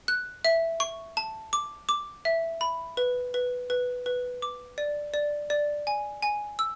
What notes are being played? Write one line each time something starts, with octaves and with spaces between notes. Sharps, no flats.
F#6
E5
C#6
A5
D6
D6
E5
B5
B4
B4
B4
B4
D6
D5
D5
D5
G#5
G#5
E6